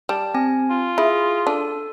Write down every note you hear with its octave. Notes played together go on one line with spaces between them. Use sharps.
G3 A5
C4 G#5
F4
E4 G#4
D4 A4